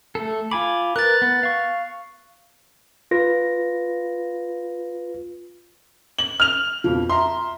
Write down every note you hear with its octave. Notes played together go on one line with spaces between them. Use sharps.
A3 A4
F4 G#5 B5 D6
A#4 B4 F#6 A6
B3
F5 C#6
F4 B4 A#6
F#7
F6 F7
F2 B2 F3
E5 A#5 C6